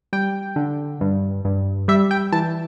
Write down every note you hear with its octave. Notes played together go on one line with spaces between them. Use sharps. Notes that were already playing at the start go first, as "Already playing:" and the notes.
G3 G5
D3
G2
G2
G3 E5
G5
E3 A5